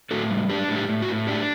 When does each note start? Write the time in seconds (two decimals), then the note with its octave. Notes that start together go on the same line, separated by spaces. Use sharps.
0.11 A2 F#4 A4
0.30 G3
0.50 D4 G4
0.69 A2
0.76 G4
0.89 A2
1.02 F#4
1.08 A2
1.27 D4 G4